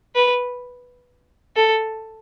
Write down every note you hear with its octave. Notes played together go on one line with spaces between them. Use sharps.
B4
A4